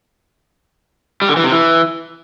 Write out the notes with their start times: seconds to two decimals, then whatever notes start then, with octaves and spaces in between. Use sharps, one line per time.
1.22 G3
1.29 D3
1.37 E3
1.44 C3
1.52 E3